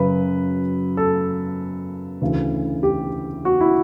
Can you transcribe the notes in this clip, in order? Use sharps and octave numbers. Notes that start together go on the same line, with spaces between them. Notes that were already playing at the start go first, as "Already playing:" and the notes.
Already playing: F#2 C#3 F#3 B4
A4
D2 C#3 E3
G4
F#4
E4